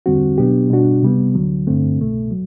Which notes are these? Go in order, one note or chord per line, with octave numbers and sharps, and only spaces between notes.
E2 D3 G3 C4 F#4
B2 F#3 B3 D4 G4
B2 G3 D4 F#4
C3 G3 B3
D2 D3 F#3
G2 D3 A3 C4
C2 B2 A3
F#3